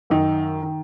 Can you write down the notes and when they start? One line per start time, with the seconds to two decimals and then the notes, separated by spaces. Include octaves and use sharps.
0.10 F#2 D#3 D#4
0.63 D#3